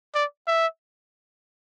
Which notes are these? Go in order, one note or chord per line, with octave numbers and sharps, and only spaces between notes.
D5
E5